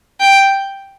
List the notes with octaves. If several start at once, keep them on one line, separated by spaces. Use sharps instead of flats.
G5